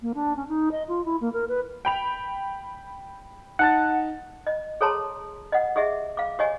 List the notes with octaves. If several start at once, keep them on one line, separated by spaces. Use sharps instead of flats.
A#3
D4
C#4
D#4
D#5
F4
E4
A#3
A#4
B4
G5 B5 F7
D#4 F#5 A5 A6
D#5
G#4 A4 C#5 A5 A#5 C6
D#5 F#5
G4 G#4 D#5 E5
F5 D6
G4 C#5 D#5 G#5